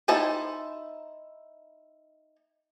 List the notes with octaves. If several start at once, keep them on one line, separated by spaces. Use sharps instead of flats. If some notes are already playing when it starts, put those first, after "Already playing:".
D#4 E4 C5 A5